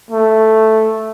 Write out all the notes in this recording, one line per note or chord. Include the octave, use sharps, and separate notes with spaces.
A3